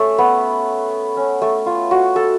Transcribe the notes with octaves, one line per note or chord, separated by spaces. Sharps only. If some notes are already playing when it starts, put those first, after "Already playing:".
Already playing: A3 C#4
B3
C#4
A3
F4
F#4
A4